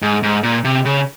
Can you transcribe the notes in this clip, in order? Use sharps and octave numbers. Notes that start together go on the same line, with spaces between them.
G#2
G#2
A#2
C3
C#3